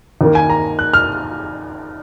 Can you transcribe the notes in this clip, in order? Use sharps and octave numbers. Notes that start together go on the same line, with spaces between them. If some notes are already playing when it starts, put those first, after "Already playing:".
D#2 D#3 A#3
G#5
A#5
F#6
F6